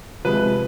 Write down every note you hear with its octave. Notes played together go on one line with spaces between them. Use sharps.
C3 F3 G#3 B4